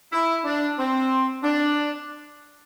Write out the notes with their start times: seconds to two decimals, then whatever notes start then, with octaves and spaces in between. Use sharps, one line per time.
0.13 E4
0.45 D4
0.78 C4
1.43 D4